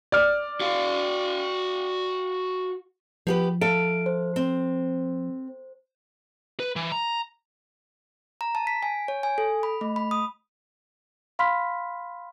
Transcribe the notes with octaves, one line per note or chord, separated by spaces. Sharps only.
D5 F6
F#4 F5
F3 B3 G4 B4
A4 E5 F5 D7
C5
C4
B4
E3
A#5
A#5
A5
B6
G#5
C#5
G#5
A4
B5
A3
B5
D#6
F5 B5 C6 F6 B6